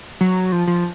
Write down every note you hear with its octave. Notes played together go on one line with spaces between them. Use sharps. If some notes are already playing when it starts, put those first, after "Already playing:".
F#3
F3
F3